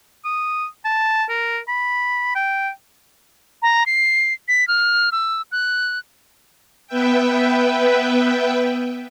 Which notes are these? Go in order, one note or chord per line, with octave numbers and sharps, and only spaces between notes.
D#6
A5
A#4
B5
G5
A#5
C7
B6
F6
E6
F#6
B3 B4 E5 G5